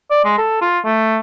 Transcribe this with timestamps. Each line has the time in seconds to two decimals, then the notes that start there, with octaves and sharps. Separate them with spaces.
0.10 D5
0.25 G#3
0.38 A4
0.61 F4
0.85 A3